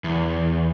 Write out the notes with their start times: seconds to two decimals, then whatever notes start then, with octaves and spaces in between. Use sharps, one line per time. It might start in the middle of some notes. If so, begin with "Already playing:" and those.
0.04 E2